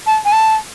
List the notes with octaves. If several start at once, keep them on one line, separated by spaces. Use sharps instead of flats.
A5
G#5
A5